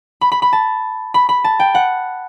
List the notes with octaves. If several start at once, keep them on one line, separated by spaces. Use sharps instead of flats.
B5
B5
B5
A5
B5
B5
A5
G5
F#5